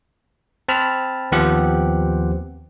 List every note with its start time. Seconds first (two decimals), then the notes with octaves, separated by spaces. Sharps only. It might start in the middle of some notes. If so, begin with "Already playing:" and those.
0.68 C4 A5 B5 F6
1.32 D#2 F3 B3 C4 G4 F#5